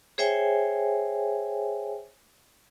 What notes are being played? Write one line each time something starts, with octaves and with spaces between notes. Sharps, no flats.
G#4 C5 C#5 E5 G5 G#5